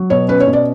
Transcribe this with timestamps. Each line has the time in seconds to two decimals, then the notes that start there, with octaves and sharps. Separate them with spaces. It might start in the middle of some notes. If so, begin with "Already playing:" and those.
Already playing: F#3
0.10 B2 C#5
0.28 C#4 B4
0.40 C#5
0.47 B2
0.53 D5